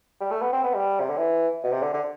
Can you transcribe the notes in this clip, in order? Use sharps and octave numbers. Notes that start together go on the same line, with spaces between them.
G3
A3
B3
C4
B3
G3
C3
D3
E3
B2
C3
D3
D3